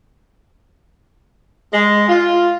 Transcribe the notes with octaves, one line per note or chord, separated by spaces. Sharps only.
G#3
F4